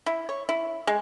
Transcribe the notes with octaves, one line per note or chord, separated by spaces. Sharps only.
E4
C#5
E4
G#3